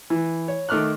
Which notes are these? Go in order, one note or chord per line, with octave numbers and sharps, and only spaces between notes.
E3
C#5
D#3 A3 D6 F6 F#6